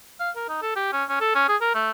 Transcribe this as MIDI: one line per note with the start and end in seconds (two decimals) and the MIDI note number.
0.20 0.30 77
0.36 0.46 70
0.49 0.58 63
0.62 0.74 69
0.76 0.89 67
0.92 1.04 61
1.09 1.16 61
1.20 1.34 69
1.35 1.46 61
1.48 1.56 68
1.61 1.73 70
1.75 1.91 57